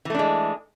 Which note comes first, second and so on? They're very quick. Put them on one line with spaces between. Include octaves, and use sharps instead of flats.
E3 A3 D4 G#3